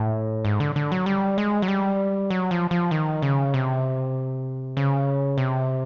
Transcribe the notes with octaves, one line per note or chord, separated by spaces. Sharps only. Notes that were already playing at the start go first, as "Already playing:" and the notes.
Already playing: A2
G#2
D3
D3
F#3
G3
G#3
F#3
G3
F#3
F3
F3
D#3
C#3
C3
C#3
C3